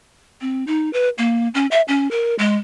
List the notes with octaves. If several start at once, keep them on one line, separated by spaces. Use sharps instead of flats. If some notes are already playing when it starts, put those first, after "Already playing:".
C4
D#4
B4
A#3
C#4
E5
C#4
A#4
G#3